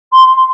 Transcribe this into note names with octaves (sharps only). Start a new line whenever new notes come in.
C6